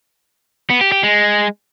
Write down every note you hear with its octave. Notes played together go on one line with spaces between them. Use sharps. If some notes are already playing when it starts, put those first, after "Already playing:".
B3
G4
G4
G#3